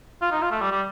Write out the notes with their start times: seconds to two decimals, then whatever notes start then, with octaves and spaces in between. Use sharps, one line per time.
0.21 F4
0.32 D#4
0.42 F4
0.51 A3
0.61 G3
0.72 G3